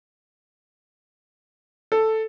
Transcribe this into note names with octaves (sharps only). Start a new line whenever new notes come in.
A4